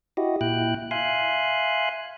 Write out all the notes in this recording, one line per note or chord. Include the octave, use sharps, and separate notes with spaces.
E4 F#4 G4 D#5
A#2 E4 G5 F#6
E5 F5 G#5 C6 F#6